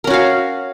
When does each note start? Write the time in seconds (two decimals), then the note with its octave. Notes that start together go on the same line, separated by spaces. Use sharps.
0.04 A#4
0.07 C#4
0.10 F#4
0.13 F5